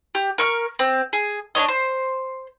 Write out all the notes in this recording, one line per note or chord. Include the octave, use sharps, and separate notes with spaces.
G4
A#4 C#6 F6
C4
G#4
D4 A#4 C#5 D#5
C5